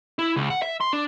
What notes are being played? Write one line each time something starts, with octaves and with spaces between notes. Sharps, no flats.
E4
C#2
F#5
E5
C6
D4